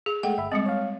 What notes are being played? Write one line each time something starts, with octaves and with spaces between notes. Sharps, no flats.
G#4
G#3 A3 F#5 G5
G1 E5 B5
G3 G#3 C4 D#5
C#5 F5